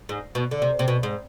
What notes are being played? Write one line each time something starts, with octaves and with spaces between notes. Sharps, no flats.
G#2
B2
D3
C3
C3
B2
G#2